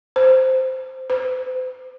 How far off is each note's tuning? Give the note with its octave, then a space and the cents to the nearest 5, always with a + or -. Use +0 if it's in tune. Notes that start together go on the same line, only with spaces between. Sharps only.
C5 -10
C5 -45